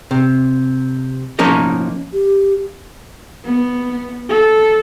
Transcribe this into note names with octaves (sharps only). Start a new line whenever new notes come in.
C3
F3 A#3 C#4 D#4 A#4 D#5
G4
B3
A4